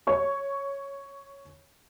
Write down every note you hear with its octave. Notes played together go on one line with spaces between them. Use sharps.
C#5 C#6